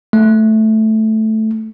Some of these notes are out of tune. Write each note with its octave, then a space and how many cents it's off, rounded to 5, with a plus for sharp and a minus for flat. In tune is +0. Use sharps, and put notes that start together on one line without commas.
A3 -5